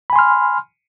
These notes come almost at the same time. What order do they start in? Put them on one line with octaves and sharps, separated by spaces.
B5 G#5 C6 F6